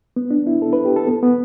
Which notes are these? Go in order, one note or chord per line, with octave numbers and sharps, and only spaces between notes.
B3
D4
E4
A4
B4
G4
A4
B3
B3